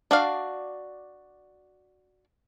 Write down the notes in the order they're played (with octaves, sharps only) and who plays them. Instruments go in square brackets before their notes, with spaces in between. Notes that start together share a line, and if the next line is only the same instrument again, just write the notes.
[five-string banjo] D4 F#4 D5 F5